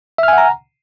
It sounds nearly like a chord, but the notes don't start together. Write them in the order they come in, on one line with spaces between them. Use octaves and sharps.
E5 F6 G#5 F#5 A#5